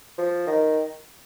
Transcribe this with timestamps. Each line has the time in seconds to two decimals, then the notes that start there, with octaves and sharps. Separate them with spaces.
0.18 F3
0.47 D#3